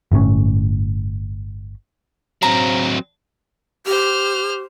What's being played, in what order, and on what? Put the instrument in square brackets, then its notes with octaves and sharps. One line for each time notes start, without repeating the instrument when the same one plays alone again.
[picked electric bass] G1 A2 C3 C#4
[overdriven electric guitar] F#3 C4 [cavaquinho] A#5
[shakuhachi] G4 [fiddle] C5 F6